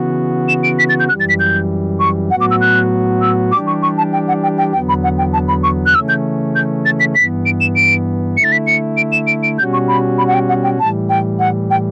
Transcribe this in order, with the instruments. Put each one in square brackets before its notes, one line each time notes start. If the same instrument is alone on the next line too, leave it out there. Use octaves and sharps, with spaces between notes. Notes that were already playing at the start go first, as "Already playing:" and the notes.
Already playing: [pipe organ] C#3 E3 B3 F#4
[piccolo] E7
D7
B6
A6
G6
[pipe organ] F#2 E3 G3 [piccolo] F#6
[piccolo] A6
B6
G6
C#6
[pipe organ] A2 F#3 B3 F#4 [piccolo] F#5
[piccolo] D6
E6
F#6
E6
[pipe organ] E3 G3 D4 G4 [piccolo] D6
[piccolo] C#6
C#6
A5
G5
F#5
G5
G5
[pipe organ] E2 D3 F#3 B3 [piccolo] G5
[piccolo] B5
F#5
G5
A5
B5
C#6
F#6
[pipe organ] C#3 E3 A3 C#4 [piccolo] E6
[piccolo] G6
G6
A6
B6
[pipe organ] G2 E3 B3 [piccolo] B6
[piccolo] D7
E7
D7
[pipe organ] D3 A3 E4 [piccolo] C#7
[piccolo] A6
B6
C#7
D7
E7
D7
D7
[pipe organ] B2 G3 C#4 F#4 [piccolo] G6
[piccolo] C#6
B5
B5
F#5
G5
F#5
G5
[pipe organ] A2 E3 G3 [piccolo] A5
[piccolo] G5
F#5
G5